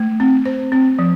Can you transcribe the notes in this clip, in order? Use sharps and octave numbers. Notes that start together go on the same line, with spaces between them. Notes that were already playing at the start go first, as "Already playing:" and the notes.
Already playing: A3
C4
C5
C4
F3